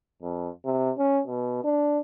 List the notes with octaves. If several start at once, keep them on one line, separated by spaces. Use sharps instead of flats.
F2
C3
C#4
B2
D4